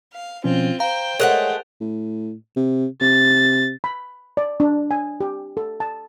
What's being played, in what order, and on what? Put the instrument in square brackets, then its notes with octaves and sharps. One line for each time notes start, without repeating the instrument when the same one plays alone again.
[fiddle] F5
[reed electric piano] B2 F3 C#4 [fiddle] C4 F4
[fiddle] C5 G5 [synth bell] F5 [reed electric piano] A#5
[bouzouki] G#3 A3 F#5 [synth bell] A#4 [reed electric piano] C#5 F#6
[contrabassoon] A2
C3
[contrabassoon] C3 [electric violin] A6
[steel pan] B5
D5
D4
G#5
G4
A4
A5